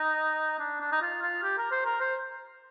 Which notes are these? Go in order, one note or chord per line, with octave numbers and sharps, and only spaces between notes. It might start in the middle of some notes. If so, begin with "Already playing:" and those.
Already playing: D#4
D4
D4
D#4
F4
F4
G4
A#4
C5
A#4
C5